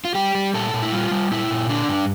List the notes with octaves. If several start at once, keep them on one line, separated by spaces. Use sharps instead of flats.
F4
G3 G4
G3
A#2 A4
A#2
E4
G3 F4
G3
A#2 E4
A#2
D3 D4
G2